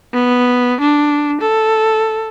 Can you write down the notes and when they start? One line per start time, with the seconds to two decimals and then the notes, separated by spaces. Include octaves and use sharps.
0.13 B3
0.81 D4
1.41 A4